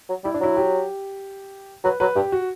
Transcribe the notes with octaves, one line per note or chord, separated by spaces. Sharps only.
F#3
G3 E4
D4
F#3 E4
G4
F#3 B4
F#3 B4
G2 G4
F#4